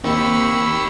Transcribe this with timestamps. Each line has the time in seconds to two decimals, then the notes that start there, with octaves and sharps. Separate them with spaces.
0.04 D#2 D#3 C4 D#4 G4 B5 C#6 E6